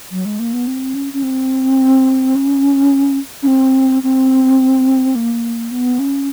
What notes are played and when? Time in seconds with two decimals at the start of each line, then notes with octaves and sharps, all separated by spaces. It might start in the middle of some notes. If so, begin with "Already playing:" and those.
0.12 F#3
0.25 G#3
0.39 A#3
0.53 B3
0.67 C4
0.95 C#4
1.13 C#4
1.23 C4
2.35 C#4
3.43 C#4
3.47 C4
4.03 C4
5.15 A#3
5.71 B3
5.99 C#4